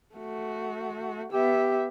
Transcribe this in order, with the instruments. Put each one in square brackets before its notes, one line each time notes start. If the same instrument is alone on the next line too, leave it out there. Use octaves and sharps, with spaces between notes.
[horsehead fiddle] A3 F#4
[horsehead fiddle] B3 E5 [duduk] G4